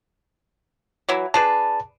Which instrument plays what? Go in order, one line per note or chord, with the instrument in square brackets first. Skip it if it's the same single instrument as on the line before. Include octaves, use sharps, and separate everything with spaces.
[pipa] E3 F#3 E4
[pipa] D4 G#4 B4 [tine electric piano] A5